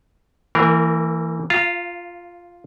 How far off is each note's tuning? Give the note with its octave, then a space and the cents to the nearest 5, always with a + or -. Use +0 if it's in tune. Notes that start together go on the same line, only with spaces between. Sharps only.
E3 +0 A#3 -35 A#4 +0
F4 +0 F5 -25 A#5 +0